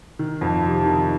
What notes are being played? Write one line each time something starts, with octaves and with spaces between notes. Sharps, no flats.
D#3
F2
C3
D#3